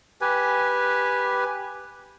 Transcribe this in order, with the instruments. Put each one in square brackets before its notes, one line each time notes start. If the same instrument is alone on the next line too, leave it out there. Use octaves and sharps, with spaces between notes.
[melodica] G4 B4 G#5